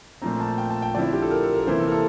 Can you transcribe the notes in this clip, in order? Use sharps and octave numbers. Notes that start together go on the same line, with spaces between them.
A#2 F3 A3 C4 A#5
A5
G5
A5
G5
D3 F3 C4 E4 D5
G4
A4
A#4
A4
A#4
C3 E3 A#3 E4 C5
A4
A#4
A4